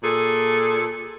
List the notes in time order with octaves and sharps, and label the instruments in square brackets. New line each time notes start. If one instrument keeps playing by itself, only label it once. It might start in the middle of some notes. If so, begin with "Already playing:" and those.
[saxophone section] A#2 G#4 A4